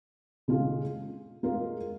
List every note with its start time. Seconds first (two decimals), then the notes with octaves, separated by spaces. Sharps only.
0.48 C#3 G#3 F4 G#4
1.43 G#3 F4 A#4